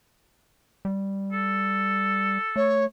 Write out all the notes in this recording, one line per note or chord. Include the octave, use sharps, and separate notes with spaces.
G3
A4
A3 C#5